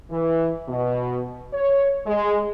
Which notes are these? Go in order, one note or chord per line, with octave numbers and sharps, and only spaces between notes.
E3
B2
C#5
G#3